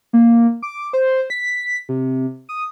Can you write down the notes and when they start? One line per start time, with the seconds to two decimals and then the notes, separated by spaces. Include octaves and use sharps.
0.13 A#3
0.62 D6
0.93 C5
1.30 B6
1.89 C3
2.49 D#6